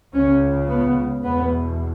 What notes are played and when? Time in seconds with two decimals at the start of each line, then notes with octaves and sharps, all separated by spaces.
0.13 C#2 C#3 C#4
0.68 B3
1.23 E2 B2 B3